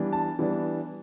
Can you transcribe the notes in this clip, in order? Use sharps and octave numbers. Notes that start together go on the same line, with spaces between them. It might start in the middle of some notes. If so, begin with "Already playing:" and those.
Already playing: E3 G3 B3 D4
A5
E3 G3 B3 D4